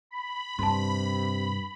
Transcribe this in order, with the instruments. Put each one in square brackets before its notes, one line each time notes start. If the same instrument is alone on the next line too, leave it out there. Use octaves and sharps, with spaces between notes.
[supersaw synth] B5
[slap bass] G2 [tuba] C3 [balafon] A5 C6